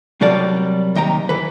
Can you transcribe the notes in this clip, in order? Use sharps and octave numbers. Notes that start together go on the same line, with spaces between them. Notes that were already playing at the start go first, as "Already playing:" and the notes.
C3 F#3 G3 A#4 D5 A5
D#2 D#5 G5 A#5
E3 B4